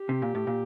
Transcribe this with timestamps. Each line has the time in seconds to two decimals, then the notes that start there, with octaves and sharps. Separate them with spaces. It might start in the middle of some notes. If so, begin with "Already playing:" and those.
Already playing: G4
0.09 C3
0.22 A#2
0.35 A2
0.47 A#2